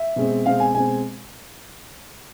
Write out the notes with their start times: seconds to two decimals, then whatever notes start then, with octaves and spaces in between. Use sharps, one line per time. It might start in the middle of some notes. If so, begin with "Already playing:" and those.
Already playing: E5
0.16 B2 G#3 C4
0.46 B2 G#3 C4 F5
0.60 G#5
0.75 B2 G#3 C4 G#5